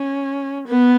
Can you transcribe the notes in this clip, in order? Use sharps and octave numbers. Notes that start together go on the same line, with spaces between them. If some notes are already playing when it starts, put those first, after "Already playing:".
Already playing: C#4
B3